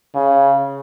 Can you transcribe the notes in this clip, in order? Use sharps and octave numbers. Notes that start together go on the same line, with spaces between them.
C#3